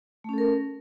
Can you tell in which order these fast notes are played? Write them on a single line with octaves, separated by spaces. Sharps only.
A3 C#4 A4 A#4